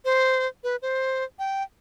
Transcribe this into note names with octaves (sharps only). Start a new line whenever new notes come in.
C5
B4
C5
G5